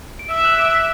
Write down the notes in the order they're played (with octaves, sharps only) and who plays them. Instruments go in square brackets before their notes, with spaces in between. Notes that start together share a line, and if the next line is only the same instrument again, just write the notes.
[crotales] D7
[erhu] E5 [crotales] E6 E7
[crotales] F#6 F#7
E7
D6 D7
B6